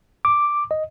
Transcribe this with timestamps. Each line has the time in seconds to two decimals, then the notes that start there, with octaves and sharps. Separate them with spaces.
0.25 D6
0.71 D#5